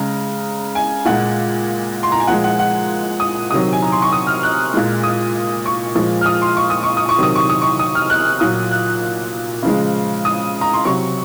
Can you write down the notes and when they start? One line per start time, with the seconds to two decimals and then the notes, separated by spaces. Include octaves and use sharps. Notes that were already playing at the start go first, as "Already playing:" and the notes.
Already playing: C#3 G#3 A#5
0.75 G#5
1.05 A#2 G#3 F#5
2.03 C6
2.12 A#5
2.20 G#5
2.27 A#2 F3 G#3 F#5
2.44 F#5
2.59 F#5
3.20 D#6
3.50 C3 D#3 F#3 D#6
3.72 G#5
3.82 A#5
3.92 C6
4.02 C#6
4.12 D#6
4.27 F6
4.43 F#6
4.74 A#2 G#3
5.03 D#6
5.65 C#6
5.95 A#2 F3 G#3
6.21 F6
6.26 D#6
6.42 C6
6.57 C#6
6.70 D#6
6.83 C#6
6.97 D#6
7.09 C#6
7.18 C3 D#3 F#3 D#6
7.35 C#6
7.49 D#6
7.62 C#6
7.79 D#6
7.95 F6
8.10 F#6
8.40 A#2 F#3 D#6
8.71 F#6
9.62 C#3 F3 G#3
10.25 D#6
10.61 A#5
10.74 C6
10.85 C3 F#3 C#6